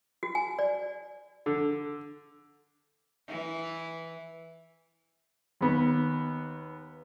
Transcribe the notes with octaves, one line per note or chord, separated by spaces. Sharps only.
F#4
G#5
D5
D3
E3
D#2 B3